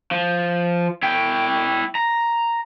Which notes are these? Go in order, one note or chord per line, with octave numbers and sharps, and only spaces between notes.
F3
E4 G5
A#5